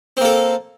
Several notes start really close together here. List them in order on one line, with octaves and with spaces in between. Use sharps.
C4 A#3 A4